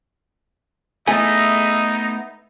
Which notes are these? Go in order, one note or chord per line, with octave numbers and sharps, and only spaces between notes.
A3 B3 D#4 E4 G#4 D#5 E5 G#5